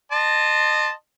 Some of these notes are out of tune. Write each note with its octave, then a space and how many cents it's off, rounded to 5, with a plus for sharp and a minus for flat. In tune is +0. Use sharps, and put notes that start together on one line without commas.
D#5 -25 A5 +0 C6 +0